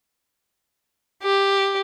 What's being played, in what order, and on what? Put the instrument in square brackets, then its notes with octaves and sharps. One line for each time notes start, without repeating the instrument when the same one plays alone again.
[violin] G4